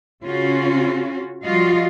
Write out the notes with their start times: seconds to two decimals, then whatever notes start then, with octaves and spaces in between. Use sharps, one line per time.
0.22 C#3 C#4 F4 F#4
1.43 F3 G3 F4 F#4 D#5 F5